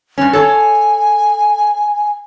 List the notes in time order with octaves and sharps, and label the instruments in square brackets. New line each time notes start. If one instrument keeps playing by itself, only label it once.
[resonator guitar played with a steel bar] G2 C#4
[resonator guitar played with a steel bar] A4 C#5 A5 [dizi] G#5